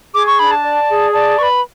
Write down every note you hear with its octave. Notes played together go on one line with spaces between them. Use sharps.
G#4 D6
C#6
D4 B5
A5
D5
G#4
D5 A5
B4 B5 C#6